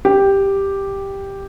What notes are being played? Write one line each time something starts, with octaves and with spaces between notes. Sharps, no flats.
G4